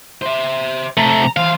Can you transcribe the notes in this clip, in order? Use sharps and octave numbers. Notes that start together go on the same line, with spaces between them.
C5 E5
C3 A3 A#5
E3 C5 F5